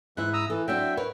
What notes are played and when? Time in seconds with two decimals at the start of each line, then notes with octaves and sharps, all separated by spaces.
0.17 G#2 E3 E4 F#6
0.33 A#5 D#6 E6
0.50 E3 A4
0.68 F#3 C4 D4 E5 G5
0.97 A#4 B4 C#5